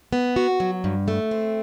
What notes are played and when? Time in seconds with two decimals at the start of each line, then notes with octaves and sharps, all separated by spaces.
0.13 B3
0.36 F#4
0.60 F#3
0.84 G2
1.08 A3
1.31 C4